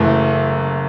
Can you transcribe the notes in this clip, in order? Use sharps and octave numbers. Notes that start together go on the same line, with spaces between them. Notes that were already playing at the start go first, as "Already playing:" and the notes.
Already playing: F#1 F#2 E3 A3